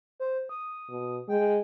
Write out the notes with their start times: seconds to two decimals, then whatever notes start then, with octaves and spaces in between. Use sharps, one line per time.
0.20 C5
0.49 D#6
0.89 B2
1.29 G#3 G5